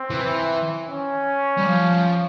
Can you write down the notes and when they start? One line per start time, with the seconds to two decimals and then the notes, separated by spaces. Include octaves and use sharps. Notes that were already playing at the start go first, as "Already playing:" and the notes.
Already playing: C4
0.10 E3
0.89 C#4
1.58 G3
1.67 F3